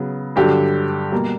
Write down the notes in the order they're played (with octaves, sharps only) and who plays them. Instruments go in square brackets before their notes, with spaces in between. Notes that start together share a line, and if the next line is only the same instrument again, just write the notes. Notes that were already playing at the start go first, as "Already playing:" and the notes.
Already playing: [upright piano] C#3 F#3 B3
G2 D3 F#3 G4
B2 G3 A#3